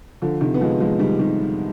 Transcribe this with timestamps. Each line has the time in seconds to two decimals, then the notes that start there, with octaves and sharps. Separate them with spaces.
0.22 D3 F3
0.41 C3 D#3
0.54 B3
0.61 F3 G#3
0.80 F3 G#3
0.99 D#3 G3
1.19 D#3 G3